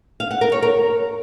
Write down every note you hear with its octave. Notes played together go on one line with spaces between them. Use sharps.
F5
F#5
A#4
C#5
A#4